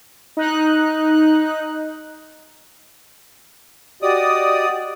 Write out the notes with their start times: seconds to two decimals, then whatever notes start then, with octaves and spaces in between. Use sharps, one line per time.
0.37 D#4 F#6
4.02 F#4 G4 D5 D#5 D#6